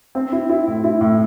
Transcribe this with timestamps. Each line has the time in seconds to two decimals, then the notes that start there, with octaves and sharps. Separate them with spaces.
0.15 C4
0.32 E4
0.50 E4
0.67 A2
0.84 E4
1.01 A2